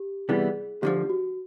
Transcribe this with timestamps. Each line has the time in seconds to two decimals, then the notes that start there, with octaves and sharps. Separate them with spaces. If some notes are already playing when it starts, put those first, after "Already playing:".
Already playing: G4
0.29 C3 E3 G3 B3 G#4
0.82 D2 D3 F3 G4
1.10 F#4